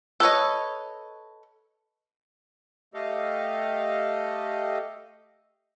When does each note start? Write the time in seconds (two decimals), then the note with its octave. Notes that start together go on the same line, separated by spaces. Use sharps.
0.20 A4 B4 C#5 D#5
2.94 A3 G4 A4 D#5 F5